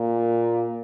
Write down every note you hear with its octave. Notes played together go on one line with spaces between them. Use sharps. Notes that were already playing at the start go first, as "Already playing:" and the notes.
Already playing: A#2